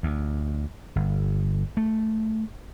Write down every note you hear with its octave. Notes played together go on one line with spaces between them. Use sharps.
D2
G1
A3